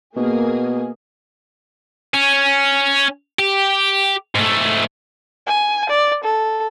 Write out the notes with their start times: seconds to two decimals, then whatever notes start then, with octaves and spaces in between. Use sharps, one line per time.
0.16 B2 A#3 G#4
2.14 C#4
3.39 G4
4.35 G#2 A3
5.47 G#5
5.89 D5
6.24 A4